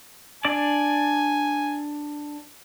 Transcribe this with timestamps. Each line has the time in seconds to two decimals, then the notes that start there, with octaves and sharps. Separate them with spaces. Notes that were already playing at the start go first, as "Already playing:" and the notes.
0.45 D4 D5 G#5 D6